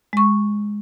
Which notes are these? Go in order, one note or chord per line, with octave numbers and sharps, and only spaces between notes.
G#3 C#6